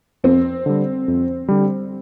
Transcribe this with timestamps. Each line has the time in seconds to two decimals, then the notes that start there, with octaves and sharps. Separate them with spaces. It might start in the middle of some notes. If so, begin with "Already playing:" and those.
0.24 F2 C4
0.66 D3 G3
1.08 F2
1.48 D3 G3